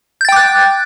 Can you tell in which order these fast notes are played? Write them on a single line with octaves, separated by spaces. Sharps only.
G6 A6 G5 D6 F#6